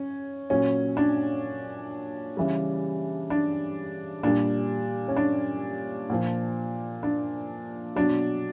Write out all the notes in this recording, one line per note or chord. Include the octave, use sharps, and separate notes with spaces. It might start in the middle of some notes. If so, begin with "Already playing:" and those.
Already playing: C#4
A#2 F#3 C#4
D4
C#3 E3 G3
D4
A#2 G3 D4
C#4
D4
A#2 F3
D4
B2 F#3 D4